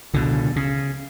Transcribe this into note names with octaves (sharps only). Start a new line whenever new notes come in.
C#2 B2 D3
C#3